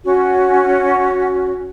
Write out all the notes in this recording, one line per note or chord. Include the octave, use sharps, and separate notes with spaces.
C#4 F#4